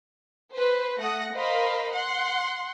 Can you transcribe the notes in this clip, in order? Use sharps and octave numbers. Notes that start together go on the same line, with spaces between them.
B4 C5
A3 F#5 D#6 A#6
A#4 C5 D#5 F5 B5
F#5 C6